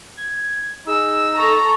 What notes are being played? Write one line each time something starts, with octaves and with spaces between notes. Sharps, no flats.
G#6
D#4 G#4 E6
A4 A#5 C#6